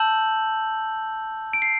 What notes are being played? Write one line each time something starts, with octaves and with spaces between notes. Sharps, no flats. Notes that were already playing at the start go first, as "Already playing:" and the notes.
Already playing: A5 E6 G6 F#7
D7
C7